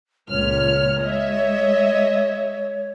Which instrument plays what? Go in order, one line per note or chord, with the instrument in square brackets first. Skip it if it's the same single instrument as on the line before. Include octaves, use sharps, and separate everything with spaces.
[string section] C#2 A#2 F6 [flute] C#5
[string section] G#3 D#5 E5